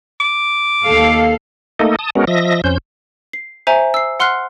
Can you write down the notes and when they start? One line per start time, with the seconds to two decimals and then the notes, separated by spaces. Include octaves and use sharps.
0.20 D6
0.83 D#2 A4 F5
1.79 A3 A#3 D#4 A4 D#5
1.99 A5 D#6
2.15 G#3 B3 C#4 F#4 A#4
2.27 F3 D#5 E5 A#6
2.64 F2 C#4 C5 G6
3.33 C7
3.67 C5 E5 G#5 A#5
3.94 E6 C7
4.20 F#5 C6 F6 F#6 C7